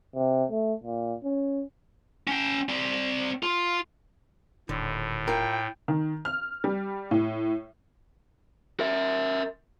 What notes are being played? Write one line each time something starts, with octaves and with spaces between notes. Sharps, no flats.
C3
A3
A#2
C#4
C#4 G5
C4 D5
F4
D#1 A2 D3
F4 A#4 G5
D#3
F6
G3
A2
A#4 E5